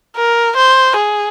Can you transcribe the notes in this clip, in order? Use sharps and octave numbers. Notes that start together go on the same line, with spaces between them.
A#4
C5
G#4